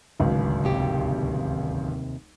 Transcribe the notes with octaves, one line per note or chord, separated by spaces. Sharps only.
D1 G#1 C#2
D#2 C3 G4